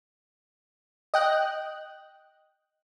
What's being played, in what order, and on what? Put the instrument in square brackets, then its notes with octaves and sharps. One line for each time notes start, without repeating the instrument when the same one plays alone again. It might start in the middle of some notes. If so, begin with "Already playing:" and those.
[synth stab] D#5 G5 F#6